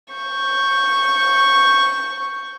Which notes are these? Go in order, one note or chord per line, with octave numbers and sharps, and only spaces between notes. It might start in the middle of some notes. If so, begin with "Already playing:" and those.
C#6 G6